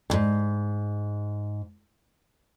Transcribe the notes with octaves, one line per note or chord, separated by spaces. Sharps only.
D2 G#2